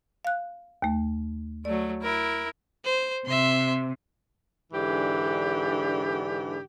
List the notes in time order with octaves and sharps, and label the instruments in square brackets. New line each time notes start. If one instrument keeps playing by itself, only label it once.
[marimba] F5 F#6
D#2 A3
[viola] F#3 A3 [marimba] D5
[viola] E4 A#4
[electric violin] C5
[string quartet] C3 [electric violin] E5 C6
[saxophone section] G#2 D3 E3 D4 G4